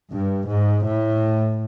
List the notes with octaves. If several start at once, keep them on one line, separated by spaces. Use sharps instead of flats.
G2
G#2
A2